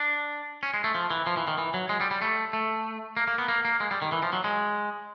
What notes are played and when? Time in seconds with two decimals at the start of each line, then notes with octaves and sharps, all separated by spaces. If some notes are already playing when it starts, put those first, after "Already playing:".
Already playing: D4
0.63 C#4
0.74 G#3
0.84 A3
0.95 F3
1.11 E3
1.27 F3
1.37 E3
1.48 D#3
1.58 E3
1.74 F#3
1.89 G#3
2.01 G3
2.11 G3
2.22 A3
2.53 A3
3.17 A#3
3.28 A#3
3.38 B3
3.48 A#3
3.65 A#3
3.80 G#3
3.91 G3
4.02 D#3
4.12 E3
4.23 F3
4.33 F#3
4.44 G#3